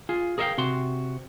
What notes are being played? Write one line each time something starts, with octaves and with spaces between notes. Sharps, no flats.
F4 G#4
G#4 A#4 D5 E5 F5 G5
C3 F#4 C6